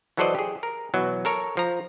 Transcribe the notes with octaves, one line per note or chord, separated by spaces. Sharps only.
E3 F#3 A4 C5 D5 D#5
G4 G#4
A#4
B2 E3 F#3
A4 A#4 C#5
F3 A#5